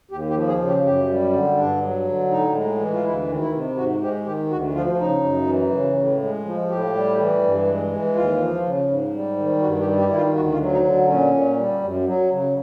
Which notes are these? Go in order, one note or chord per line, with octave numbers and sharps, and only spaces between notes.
D#2 G4
G4
F3
G#4
C#3
G4
F#2 G4
G3
D3
G2 D4
F#3
D3
A2 D#4
G#3
E3
F4
D2 E4
D#3
E4
C3
G#2 F#4
G#3 G4
D#3 G4
D2 F#4
F3 F4
C#3 D#4
F#2
E3
C#3
A2
G#3
F3
A2 G4
G3
E3
G2
G#3
E3
D#2 F4
F3
C#3
G#2
G3
D#3
G2 F#4
G4
G3
G4
D#3 E4
F4
D2 F#4
F4
F#3
D#4
D3
A#2 C#4
A#2
G3
F#2
F#3
C#3